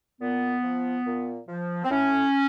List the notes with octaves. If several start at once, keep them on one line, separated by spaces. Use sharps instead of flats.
A#2 B3
F3
A#2
F3
C4
A2 C#4